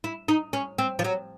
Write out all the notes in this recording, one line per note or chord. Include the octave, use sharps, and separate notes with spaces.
E4
D#4
C#4
C4
F3
F#3